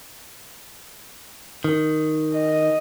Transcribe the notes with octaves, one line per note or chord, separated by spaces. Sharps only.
D#3
D#5